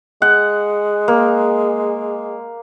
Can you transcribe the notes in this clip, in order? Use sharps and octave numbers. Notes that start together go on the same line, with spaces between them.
G#3 F#5
A#3